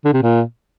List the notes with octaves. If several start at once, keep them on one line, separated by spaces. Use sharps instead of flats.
D3
C3
A#2